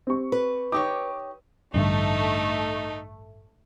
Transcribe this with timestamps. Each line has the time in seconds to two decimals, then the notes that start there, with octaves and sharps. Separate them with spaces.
0.07 C4 G4 C#6
0.32 B4
0.72 D#4 G4 C#5 D6 D#6
1.74 A1 G2 D3 A3 D#4